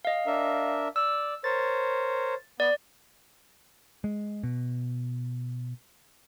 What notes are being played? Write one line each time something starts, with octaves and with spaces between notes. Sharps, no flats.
D#5 F5
D4 A#4 E5
D5 E6
A#4 C5 C#5 A6
B3 D5
G#3
B2